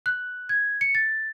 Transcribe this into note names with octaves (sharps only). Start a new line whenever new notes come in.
F#6
G#6
C#7
A6